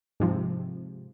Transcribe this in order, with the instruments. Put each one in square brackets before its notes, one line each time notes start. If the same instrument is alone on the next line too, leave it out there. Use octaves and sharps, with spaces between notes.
[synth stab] G#2 C3 F3